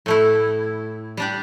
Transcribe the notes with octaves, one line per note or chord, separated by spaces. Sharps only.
A2 A3 E4
G3 D4 G4